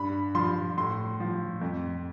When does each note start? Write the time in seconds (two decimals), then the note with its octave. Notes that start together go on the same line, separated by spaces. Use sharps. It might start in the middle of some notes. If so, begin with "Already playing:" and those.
Already playing: G2 B5
0.35 F3 C6
0.77 A2 C6
1.20 F3
1.61 F2